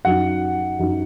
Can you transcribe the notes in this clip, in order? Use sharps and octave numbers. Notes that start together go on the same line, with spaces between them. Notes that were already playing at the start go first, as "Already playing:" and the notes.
F#2 F#3 D#4 F#5
F#2 F#3 D#4